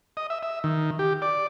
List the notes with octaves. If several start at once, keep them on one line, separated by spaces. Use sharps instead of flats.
D#5
E5
E5
D#3
G4
D5